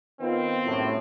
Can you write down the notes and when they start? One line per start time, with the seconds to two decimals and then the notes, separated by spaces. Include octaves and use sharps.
0.21 D#3 B3 C4 F4
0.63 C2 F#2 A2